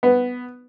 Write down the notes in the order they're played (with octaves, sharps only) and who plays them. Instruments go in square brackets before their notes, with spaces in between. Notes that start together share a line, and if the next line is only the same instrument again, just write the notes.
[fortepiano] B3